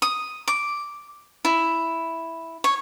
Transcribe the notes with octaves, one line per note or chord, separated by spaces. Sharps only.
D#6
D6
E4
C#5